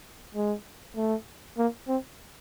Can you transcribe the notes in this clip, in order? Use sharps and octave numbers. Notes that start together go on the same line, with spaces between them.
G#3
A3
A#3
C4